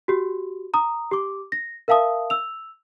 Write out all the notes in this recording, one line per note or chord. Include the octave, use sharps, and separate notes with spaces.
F#4 G4
A#5 D#6
G4 D6
A#6
A#4 E5 F5 A5 D#6
E6 F7